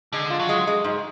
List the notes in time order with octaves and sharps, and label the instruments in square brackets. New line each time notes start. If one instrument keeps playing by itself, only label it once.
[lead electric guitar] D3 [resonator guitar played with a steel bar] G#3
[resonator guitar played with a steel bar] F4
[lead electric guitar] F#3
[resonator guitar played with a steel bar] G#3
G#3
G#2